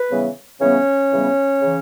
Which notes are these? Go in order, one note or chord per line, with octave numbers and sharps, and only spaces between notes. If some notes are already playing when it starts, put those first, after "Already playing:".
Already playing: B4
C#3 E3 G3 B3
C#3 E3 G3 B3 C#4 C#5
C#3 E3 G3 B3
C#3 E3